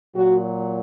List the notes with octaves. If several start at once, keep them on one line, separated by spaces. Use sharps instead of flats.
A#2 F#3 F#4